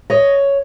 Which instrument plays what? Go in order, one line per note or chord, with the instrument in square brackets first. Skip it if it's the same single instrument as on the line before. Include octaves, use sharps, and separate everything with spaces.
[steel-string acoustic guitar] C#5 D#5